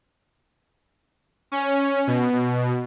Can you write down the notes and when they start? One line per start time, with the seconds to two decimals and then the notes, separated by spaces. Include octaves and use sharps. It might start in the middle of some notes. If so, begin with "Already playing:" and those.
1.52 C#4
2.07 B2